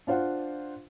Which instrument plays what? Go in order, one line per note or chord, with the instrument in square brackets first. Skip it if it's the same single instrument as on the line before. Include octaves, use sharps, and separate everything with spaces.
[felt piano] D4 F4 C5 F5 F#5